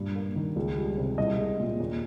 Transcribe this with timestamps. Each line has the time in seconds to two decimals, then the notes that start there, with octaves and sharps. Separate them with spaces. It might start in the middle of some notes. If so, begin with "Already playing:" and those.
Already playing: G2 A#2
0.16 A#3
0.36 D#3
0.56 C#2
0.76 G3
0.98 C3
1.18 C2 D#5
1.39 G#3
1.60 A#2
1.80 D#2